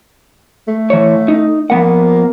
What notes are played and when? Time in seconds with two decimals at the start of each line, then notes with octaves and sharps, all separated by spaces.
0.68 A3
0.90 E3 C#5
1.28 D#4
1.70 F3 A#3 B3 F#5